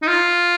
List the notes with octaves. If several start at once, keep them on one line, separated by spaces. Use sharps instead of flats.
D#4
F4